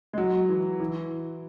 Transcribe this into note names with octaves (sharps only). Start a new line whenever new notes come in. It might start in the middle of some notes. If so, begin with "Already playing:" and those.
G#3
F#3
E3
E3